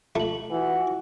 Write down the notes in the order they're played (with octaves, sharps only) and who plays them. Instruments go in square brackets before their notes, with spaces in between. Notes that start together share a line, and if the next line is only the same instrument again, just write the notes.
[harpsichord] A3 [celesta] F4 F#7
[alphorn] E3 [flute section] F#4 F#5